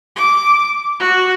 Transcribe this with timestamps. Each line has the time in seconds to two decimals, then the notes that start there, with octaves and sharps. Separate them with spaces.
0.16 D6
0.99 F#4